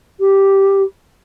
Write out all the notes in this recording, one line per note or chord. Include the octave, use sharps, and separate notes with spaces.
G4